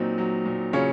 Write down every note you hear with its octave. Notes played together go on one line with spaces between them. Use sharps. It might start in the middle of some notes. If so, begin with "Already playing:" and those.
Already playing: A#2 F#3 C4 D#4
F#3
A#2
C#3 C#4 F4